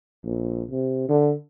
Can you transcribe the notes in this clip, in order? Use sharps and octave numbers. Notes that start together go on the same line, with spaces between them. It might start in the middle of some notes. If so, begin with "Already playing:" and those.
A#1
C3
D3